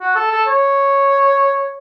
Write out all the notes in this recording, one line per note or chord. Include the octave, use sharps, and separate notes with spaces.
F#4
A4
A4
C#5